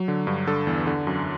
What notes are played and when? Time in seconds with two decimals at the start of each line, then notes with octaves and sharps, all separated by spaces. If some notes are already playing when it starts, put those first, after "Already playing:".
Already playing: F#3
0.08 D3
0.27 G2
0.47 D3 A4
0.67 E2
0.87 D3
1.07 F#2